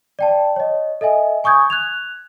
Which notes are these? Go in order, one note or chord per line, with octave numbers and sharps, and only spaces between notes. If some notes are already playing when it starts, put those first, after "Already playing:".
D5 G5 A5
C#5 D#5
A4 D#5 E5 G#5
G#5 C#6 D#6 G6 G#6
F#6 G#6 F7